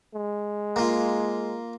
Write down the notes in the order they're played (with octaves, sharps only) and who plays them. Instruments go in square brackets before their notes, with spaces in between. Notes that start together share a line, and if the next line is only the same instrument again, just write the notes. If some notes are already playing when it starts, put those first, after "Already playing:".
[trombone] G#3
[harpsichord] A#3 F4